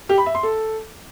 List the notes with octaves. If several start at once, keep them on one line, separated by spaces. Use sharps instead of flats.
G4
B5
E5
C6
A4